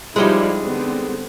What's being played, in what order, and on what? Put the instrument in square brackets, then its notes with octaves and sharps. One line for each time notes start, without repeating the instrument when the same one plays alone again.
[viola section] F3 G3 E4 [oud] G#3 C#4 D#4
[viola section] D3 B3 C4